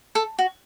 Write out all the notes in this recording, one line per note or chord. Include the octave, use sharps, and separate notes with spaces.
A4
F#4